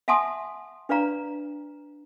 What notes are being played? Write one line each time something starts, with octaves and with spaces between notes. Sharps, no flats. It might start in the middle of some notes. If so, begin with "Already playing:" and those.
E5 F#5 G#5 A5 C6 D#6
D4 B4 D5 F5 A#5